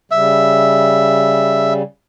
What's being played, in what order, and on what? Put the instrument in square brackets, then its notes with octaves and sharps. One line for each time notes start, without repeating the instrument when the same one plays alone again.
[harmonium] C#3 G3 [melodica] E5